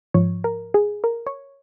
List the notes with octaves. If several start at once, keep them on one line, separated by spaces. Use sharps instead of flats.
G#2 F3 C#5
A#4
G#4
A#4
C#5